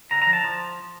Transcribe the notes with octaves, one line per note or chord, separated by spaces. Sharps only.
D3 A#5
A#5
F3
A5
F3